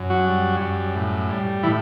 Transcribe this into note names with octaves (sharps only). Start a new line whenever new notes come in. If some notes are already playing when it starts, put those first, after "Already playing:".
Already playing: F#2
F#3 F#4
G3
F#2
A2
G3
A2 E3 E4